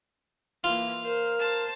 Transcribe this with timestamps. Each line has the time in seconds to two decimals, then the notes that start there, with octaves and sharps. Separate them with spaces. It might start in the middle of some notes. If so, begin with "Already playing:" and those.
0.64 E3 A#3 F4
1.04 A#4 C5
1.39 C5 A5